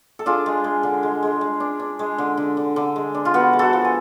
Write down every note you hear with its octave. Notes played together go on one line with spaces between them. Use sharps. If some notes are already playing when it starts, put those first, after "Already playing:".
A4
D4 F4 G#4
G#3
G#3
D3
G#3
G#3
G#3
D4
D4
G#3
D3
D3
D3
D3
G#3
D4
F4
B3 F#4
G#3
F#4 A4
F3
G#5